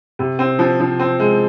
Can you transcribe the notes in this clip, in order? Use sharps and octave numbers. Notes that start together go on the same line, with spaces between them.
C3
C4
F3
F3
C4
G#3